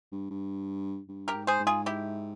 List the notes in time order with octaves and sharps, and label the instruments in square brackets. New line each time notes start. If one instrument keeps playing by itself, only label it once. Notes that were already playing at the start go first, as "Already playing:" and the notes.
[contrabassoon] G2
G2
G2
[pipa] G4 A#4
[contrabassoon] G#2
[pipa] G#4 C5
[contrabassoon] G#2
[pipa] F4 G#4
E4 G4